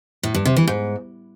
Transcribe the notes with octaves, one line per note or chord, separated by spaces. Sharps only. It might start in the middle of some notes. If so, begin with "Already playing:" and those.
A2
G2
C3
E3
G#2